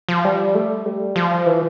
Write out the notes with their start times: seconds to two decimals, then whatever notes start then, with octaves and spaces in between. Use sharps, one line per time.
0.09 F3
0.25 G3
0.55 A3
0.86 G3
1.16 F3
1.46 E3